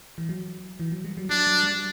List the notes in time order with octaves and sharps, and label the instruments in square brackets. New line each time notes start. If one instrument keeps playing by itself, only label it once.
[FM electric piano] E3
F#3
E3
F#3
G3
F#3
[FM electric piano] F#3 [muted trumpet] D4
[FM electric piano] F#3
G3